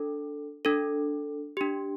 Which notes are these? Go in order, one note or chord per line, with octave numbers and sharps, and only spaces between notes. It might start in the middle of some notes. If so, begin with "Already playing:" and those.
Already playing: D4 A4
D4 A4
D4 G4